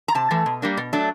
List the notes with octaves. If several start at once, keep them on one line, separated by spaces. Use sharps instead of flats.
A#5
C3 A5
E3 A3
B2
G3 A#3 D4
B2
F#3 A3 D4